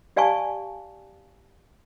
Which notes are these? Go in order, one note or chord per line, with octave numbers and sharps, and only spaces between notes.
G4 D5 F5 G#5 A5 C#6